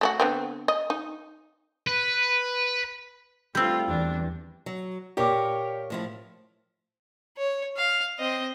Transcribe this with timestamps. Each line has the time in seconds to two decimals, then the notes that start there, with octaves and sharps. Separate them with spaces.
0.01 A3 D4 F#4
0.20 D3 B3 C4
0.68 D#5
0.90 D#4
1.87 B4
3.55 G3 A3 C4 F4 E6 G6
3.88 E2 D4
4.66 F#3
5.17 A#2 G4 A#4 C#5 D6
5.90 A2 F3 E4
7.37 C#5
7.76 F5
8.19 C4 D#5